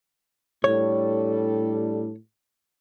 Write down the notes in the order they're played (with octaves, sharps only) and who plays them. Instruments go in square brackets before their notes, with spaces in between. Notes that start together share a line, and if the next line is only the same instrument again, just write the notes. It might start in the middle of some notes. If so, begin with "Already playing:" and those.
[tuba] A2 [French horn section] G3 D4 A4 [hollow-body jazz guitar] C#5